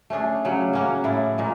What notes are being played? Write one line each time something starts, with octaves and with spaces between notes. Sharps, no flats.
A3 C#4 D4 G#4
C#3 F#3 G3
A#3 C#4 F#4
A2 E4 D5
A#2 G#3 A#3